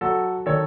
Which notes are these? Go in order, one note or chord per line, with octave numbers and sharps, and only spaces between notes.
F#3 F#4 A4
D#3 A4 C#5